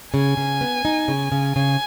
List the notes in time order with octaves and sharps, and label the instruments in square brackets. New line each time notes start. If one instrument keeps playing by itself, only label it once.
[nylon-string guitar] C#3 [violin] G#5
[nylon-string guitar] C#3
B3
D#4
C#3
C#3
[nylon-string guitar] C#3 [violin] G#5